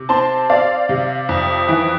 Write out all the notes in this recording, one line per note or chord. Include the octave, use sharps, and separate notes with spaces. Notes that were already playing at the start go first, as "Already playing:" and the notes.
Already playing: C3
C4 A5 C6
C4 D5 F5
C3
F2
E3